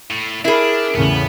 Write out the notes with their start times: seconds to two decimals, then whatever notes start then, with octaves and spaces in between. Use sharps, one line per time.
0.10 A2
0.45 D4 E4 G#4 A#4
0.95 E2 A2 C#3 B3